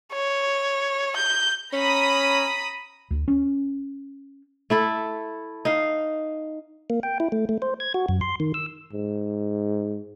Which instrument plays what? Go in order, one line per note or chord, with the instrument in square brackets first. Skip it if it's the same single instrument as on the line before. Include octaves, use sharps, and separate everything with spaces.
[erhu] C#5
G6
[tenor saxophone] C#4 [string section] A#5 B5 D#6
[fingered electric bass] D2
C#4
[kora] A3 E4 A4
D#4 F5
[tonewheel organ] A#3
G5
E4
A3
A3
C5
G#6
F#4
F#2
C6
D#3
E6
[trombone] G#2